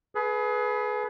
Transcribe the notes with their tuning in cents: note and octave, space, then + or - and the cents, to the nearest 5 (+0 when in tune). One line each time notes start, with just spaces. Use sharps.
G#4 +30 B4 +0